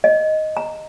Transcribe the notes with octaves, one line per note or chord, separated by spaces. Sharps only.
D#5
A#5